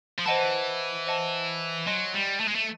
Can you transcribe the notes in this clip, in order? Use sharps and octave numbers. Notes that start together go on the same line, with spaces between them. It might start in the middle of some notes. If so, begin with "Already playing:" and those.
F3
E3 C5 D#5 F#5 A5
C5 D#5 F#5 A5
F#3 D#5 G#5 C6
G3
A3
G#3
A3